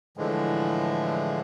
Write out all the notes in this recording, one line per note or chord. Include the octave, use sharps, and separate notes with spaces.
A2 D3 E3 F3 G#3